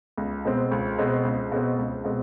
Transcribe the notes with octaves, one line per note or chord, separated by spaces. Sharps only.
C#2
B2 G#3 C4
C#2
B2 G#3 C4
C#2
B2 G#3 C4
C#2
B2 G#3 C4